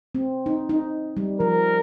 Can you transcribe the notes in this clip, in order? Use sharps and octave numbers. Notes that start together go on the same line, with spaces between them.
C4
D#4
D#4
G3
F3 A#4